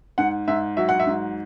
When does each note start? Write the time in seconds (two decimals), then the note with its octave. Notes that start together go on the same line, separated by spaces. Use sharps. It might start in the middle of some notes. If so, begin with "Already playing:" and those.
0.18 G#2 F#5
0.48 G#2 E5
0.77 F#3 E5
0.89 F#5
1.00 E5
1.07 G#2